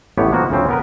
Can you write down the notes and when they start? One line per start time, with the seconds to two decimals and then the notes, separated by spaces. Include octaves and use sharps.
0.18 A1 A2 B3 G4 C#5
0.32 D#3 F3 A#3 B3 F#4
0.50 D2 C#3 F3 C4 C#4
0.69 B3 A#4 B4